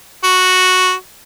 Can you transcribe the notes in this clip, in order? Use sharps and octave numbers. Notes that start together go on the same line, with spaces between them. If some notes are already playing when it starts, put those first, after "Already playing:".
F#4